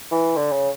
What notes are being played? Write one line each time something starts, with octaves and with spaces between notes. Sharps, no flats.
E3
D3
C#3